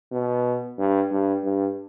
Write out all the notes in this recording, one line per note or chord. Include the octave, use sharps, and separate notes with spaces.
B2
G2
G2
G2